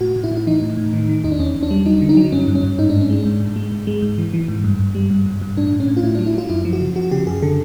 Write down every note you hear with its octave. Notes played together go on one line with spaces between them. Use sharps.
A2 F#4
A2
E4
A2
E4
E3 D#4
A2
A2
D#3
D#3
E2 D#4
D4
E2 C#4
E2
D4
G3
F#3 D#4
D3
D#4
F#3
G2 C#4
G2
C#4
G2
G#2 D#4
G#2 D4
C#4
G#3 D4
G#2
G#2
G#3
G#2
G#3
G#2
E3
E3
G#2
G2
G2
G3
G2
G2
G2
A2 D4
A2
C#4
A2
F4
A2 E4
D4
F#3
E4
F#3 F4
F#2 E4
F3
F#4
C#3
F3 F#4
C#3 G4
F#2 G#4
D3 A4